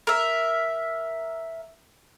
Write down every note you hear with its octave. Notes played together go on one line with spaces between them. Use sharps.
A#4 E5